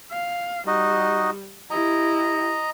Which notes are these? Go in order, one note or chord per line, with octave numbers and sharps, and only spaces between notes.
F5
G3 D#4 F#4 D#5
E4 G4 D#5 A#5